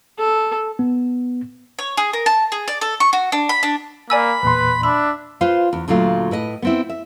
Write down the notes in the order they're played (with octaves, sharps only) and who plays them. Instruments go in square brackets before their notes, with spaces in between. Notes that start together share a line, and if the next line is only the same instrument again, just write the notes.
[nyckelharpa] A4
[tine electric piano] B3
[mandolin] C#5
G#4
A#4
A5
G#4
D5
A4
C#6
F#4
D4
B5
D4
[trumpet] A#3 [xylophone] D5 G#5 E6 [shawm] B5
[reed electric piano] E2 A#2 C6 [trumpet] B4
[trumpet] D4 [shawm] E5 [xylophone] B5
[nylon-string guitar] F4 B4 C5 F5
E2
D2 A#2 F#3 A3 F4
A2 B4 D#5
B3 C4 E4
E5